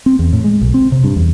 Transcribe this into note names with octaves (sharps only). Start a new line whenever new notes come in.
C4
E2
A2
G#3
B1
C4
C3
G2
E2